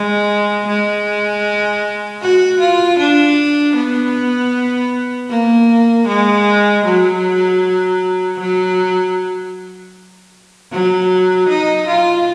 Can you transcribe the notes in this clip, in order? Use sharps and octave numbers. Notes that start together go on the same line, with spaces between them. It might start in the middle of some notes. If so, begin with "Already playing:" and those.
Already playing: G#3
G#3
F#4
F4
D4
B3
A#3
G#3
F#3
F#3
F#3
D#4
F4